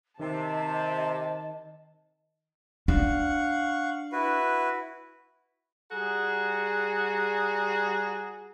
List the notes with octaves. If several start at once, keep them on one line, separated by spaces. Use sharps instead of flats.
C3 D#3 D#5 A5
D4 F5 F#5 C#6
E4 F#4 B4
G3 F#4 G#4 A#5